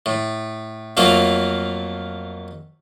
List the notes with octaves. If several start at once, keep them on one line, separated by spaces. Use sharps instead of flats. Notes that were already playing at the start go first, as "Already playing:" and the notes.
A2
F2 F#3 A3 A#3 F4